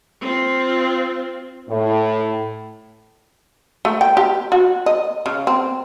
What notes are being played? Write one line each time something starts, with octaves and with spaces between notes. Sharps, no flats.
C4 F4
A2
A3
G5
G4
F#4
D#5
C#3
C4